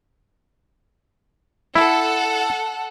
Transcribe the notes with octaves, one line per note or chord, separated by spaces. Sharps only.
E4 A4 F#5